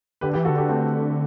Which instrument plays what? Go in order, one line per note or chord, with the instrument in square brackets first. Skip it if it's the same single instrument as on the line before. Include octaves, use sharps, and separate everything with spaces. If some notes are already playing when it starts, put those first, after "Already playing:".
[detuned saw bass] D3 [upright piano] G4 B4
[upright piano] G4 B4
[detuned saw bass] E3
[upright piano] F#4 A4
[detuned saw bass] D3
[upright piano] G4 B4
A3 C4